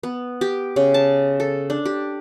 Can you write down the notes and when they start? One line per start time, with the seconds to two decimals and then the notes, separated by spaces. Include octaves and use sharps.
0.03 B3
0.41 G4
0.76 C#3
0.94 A5
1.40 A4
1.70 D4
1.85 G4